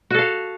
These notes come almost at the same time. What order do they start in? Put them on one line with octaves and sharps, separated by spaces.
F#4 A4 F5